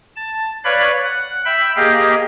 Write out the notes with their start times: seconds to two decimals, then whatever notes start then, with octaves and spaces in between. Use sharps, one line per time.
0.16 A5
0.64 B4 C#5 D5 F5 B5
1.05 F#5
1.45 E5 G5 B5
1.76 A#3 G4 G#4 D#5 F5 G5